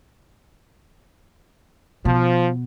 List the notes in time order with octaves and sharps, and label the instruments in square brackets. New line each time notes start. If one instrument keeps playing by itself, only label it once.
[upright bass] B2 [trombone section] F3